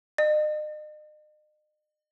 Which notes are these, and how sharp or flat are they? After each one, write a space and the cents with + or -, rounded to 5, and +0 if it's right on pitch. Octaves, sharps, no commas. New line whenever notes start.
D#5 -40